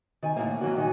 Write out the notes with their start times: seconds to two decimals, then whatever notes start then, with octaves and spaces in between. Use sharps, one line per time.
0.23 D#3 G#5
0.36 D#2 A2 A#3
0.61 E3 F#3 A#3 F#4
0.75 A#2 D#3 F#4 G#5